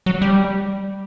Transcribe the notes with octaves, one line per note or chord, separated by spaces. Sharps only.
F#3
G3